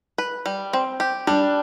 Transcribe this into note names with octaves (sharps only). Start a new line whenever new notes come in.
B4
G3
C4
G4
G3 D4